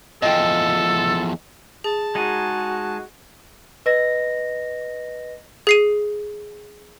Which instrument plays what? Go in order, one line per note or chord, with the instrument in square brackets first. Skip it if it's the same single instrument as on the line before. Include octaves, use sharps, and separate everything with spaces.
[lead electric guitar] E2 F3 [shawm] A4 [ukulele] D#5 G5
[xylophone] G#4 [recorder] A5
[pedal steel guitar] G#3 D#4 G#5 [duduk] F#4
[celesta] B4 D#5 A#6
[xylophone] G#4 C7 D#7